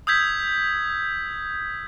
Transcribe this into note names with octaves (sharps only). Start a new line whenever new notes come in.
D#6 E6 G6 G#6 B6